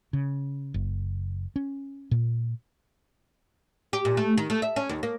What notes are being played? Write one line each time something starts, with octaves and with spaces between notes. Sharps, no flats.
C#3
F#1
C#4
A#2
G4
A#2
A3
D#3
A3
E5
C#4
D#2
A#3